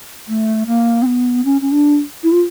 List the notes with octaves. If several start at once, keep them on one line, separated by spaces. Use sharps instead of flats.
A3
A#3
C4
B3
C#4
C#4
D4
E4
F4